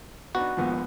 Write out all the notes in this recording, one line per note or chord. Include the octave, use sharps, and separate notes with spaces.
B3 D4 D#4 F#4
A#1 D#2 G#2 F3 B3